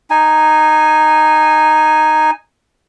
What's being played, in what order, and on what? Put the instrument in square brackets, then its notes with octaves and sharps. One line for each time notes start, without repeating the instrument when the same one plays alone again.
[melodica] D#4 G#5